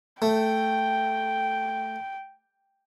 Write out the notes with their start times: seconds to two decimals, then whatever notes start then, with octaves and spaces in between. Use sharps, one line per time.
0.22 A3 G5